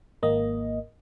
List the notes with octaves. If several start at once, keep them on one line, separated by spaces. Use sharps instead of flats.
G#1 A#3 D#5